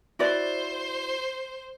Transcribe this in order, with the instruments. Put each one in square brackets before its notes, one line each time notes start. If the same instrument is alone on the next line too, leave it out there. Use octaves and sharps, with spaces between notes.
[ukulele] E4 F#4 D5 [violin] C5